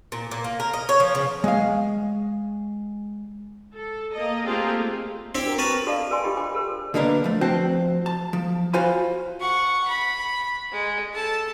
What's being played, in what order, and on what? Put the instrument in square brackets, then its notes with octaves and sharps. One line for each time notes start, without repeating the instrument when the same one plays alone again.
[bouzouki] A#2
A#2
A#3
A#4
D#5
C#5
F3
C#3
[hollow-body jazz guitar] G#3 F5
[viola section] A4
A#3 D#5
A3 A#3 C4 F4 G4 G#4
[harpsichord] C4 E4 G4 [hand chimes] D4
[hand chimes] F#4 A#4
[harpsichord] A#4 B4 A5 [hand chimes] C#6
[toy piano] F#4 A4 D5 D#5 F5 A5
A4 A#4 D5 G5 G#5 C6
D4 F4 G4 D#5 G5 B5
C5 G5 D6
A4 A#4 C5
[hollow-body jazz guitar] B2 D3 A#3 D4 A#4 B4
F3 A3
F3 C4 F#4 C5 G5 A5
A5
F3
F4 F#4 C5 F5 G#5 B5
[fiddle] F#5 C#6
B5
G#3
A4 A5